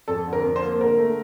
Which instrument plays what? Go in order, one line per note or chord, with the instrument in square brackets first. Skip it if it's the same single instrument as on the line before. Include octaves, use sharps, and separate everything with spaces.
[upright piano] F2 A4
D3
A#4
F2
C5
A#3
D3 A#4
A3